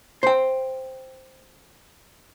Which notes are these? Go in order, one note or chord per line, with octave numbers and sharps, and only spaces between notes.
C5 G5